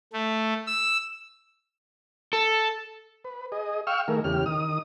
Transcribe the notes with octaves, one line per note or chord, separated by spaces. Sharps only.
A3
E6
A4
B4
G#4 D#5
F5 G5 C#6 E6 F6
D#3 A3 G#4 A#4
E2 C#3 G4 F6
D#3 D#6